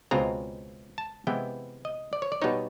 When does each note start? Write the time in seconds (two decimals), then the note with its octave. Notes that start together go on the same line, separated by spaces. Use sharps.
0.11 C#2 B2 G#3 C4 F4 A#5
0.98 A5
1.27 C3 E3 G#3 B3 E4 G5
1.85 D#5
2.13 D5
2.22 C#5
2.32 D5
2.42 B2 G3 B3 D#4 C#5